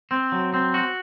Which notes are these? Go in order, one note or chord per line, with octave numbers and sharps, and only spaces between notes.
C4
F#3
C4
F#4